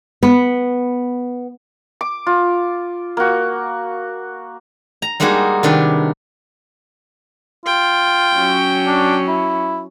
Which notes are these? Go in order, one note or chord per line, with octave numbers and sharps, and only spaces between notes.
B3
D6
F4
A#3 F#4
A#5
G3 G#3 A#3 D#4 F#4 G#4
C3 D#3 D4 B4
F4 G5
F#3 C#4
D4
E4